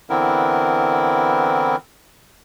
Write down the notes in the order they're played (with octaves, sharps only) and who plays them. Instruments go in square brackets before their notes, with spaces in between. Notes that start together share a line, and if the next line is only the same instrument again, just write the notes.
[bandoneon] D3 E3 B3 C4 E4 A#4